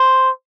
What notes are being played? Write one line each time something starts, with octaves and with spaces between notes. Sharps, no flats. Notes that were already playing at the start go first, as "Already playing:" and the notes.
Already playing: C5